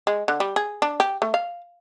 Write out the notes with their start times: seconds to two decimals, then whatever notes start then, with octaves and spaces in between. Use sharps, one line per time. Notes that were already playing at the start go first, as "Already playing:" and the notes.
0.07 G#3
0.28 D3
0.40 G3
0.56 G#4
0.82 D4
1.00 G4
1.22 A3
1.34 F5